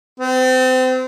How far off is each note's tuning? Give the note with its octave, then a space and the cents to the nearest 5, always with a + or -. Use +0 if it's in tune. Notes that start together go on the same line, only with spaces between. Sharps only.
C4 -30